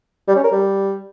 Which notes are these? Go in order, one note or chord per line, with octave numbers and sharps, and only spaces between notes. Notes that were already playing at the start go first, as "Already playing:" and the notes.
G3
C#4
A#4
G3